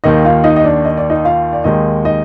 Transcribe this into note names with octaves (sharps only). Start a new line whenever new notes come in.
D#2 D#3 A#3 D#4 D#5
F4 F5
D#4 D#5
D#5
D4 D5
D#5
D5
D#4 D#5
F4 F5
D5
D#2 D#3 G#3 D#4 D#5
D#4 D#5